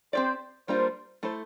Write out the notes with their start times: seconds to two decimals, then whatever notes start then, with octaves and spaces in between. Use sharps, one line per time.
0.13 C4 G4 C5 D5
0.68 G3 A#3 D4 F4 A#4 C5
1.23 A3 E4 A4 C5